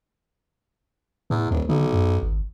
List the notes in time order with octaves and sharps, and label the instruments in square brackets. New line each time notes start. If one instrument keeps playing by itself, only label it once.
[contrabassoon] E2 [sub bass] A2
[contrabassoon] D#1 [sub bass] D#2
[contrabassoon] B1 [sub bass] D3
[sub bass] F#2
G#1